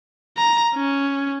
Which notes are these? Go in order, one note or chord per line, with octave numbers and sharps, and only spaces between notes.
A#5
C#4